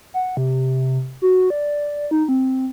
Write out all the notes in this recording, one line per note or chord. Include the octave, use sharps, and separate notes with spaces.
F#5
C3
F#4
D5
D#4
C4